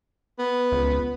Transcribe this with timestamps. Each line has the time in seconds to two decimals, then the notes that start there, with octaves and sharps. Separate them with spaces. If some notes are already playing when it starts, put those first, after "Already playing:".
0.39 B3
0.72 C#2